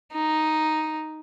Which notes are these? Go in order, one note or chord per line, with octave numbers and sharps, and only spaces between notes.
D#4